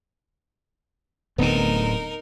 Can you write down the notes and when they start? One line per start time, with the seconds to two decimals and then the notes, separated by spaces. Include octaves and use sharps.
1.38 D1 D3 A3 B3 C4 D#4 A#4